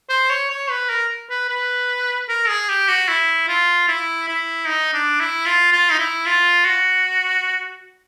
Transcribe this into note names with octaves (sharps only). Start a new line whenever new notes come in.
C5
C#5
C#5
B4
A#4
B4
B4
A#4
G#4
G4
F#4
E4
F4
E4
E4
D#4
D4
E4
F4
F4
D#4
E4
F4
F#4